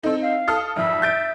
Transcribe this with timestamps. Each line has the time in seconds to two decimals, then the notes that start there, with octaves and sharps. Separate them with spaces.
0.03 C4 D#4 A4
0.21 F5
0.48 A4 D#6 F6
0.76 G#1 F2 E5
1.02 G6 A6 D7